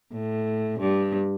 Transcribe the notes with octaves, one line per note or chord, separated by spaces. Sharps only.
A2
G2